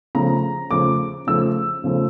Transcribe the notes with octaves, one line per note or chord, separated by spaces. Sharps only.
C#3 F3 A3 A#5
C#3 F3 A3 D6
C#3 F3 A3 E6
C#3 F3 A3